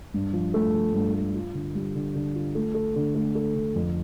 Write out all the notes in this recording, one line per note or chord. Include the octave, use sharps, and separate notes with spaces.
G2
F3
A3
F3
G2
A3
F4
D3
G3
D3
D3
F4
A3
A4
D3
A3
A4
D3
F2